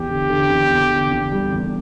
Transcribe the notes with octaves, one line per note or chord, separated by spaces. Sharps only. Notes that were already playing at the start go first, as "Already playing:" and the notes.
Already playing: E2 G4
D3
D3
E2
E2
D3
E2
G3
E2